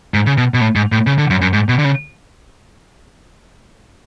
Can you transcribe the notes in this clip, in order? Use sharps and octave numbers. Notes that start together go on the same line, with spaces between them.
G#2
C#3
B2
B2
A2
G#2
A2
C#3
D3
F#2
F#2
G#2
B2
D3
C#3